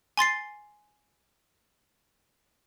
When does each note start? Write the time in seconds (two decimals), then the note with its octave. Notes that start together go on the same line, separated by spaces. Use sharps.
0.17 G#5 C6 A6 C7